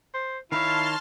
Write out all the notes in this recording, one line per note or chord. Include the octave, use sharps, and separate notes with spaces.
C5
D#3 D#4 E4 C#5 F5 A5 C6 F6